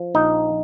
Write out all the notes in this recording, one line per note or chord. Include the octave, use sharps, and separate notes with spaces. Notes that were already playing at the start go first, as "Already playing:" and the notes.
Already playing: F3
A#1 D#4